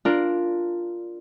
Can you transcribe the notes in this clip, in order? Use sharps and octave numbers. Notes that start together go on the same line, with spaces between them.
D4 F4 A#4